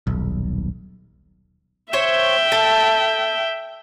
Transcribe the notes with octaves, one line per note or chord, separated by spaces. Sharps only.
D#1 B1
C5 C#5 E5 G5
A4